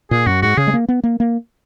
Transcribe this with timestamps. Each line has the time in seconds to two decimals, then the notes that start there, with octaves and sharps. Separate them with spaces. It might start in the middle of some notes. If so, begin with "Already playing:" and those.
0.11 A#2 G#4
0.26 F#2 F#4
0.42 G#2 F#4
0.57 C#3 G#4
0.67 G#3
0.74 A#3
0.89 B3
1.04 A#3
1.20 A#3